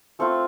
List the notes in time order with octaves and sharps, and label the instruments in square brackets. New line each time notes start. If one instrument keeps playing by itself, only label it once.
[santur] A3 C4 F4 A4